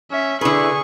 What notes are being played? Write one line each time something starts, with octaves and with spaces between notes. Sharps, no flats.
C#4 E5
D3 E4 G#4 B4 C#6